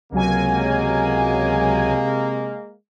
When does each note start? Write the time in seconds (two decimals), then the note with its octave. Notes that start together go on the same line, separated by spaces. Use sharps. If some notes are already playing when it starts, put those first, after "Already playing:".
0.12 C#2 C3 F#3 G#3 A#3 G#5